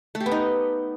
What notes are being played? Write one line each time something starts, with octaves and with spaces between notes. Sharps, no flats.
A3
G4
B3
D#4